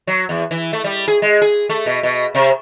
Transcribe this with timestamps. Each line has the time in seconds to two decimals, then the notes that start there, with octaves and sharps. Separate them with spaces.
0.07 F#3
0.29 E2
0.51 E3
0.73 A3
0.84 G3
1.08 G#4
1.22 G#3
1.42 G#4
1.70 A3
1.86 B2
2.03 B2
2.35 C3